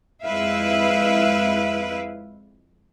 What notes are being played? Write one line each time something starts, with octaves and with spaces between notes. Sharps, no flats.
F2 G#3 E4 B4 E5 F5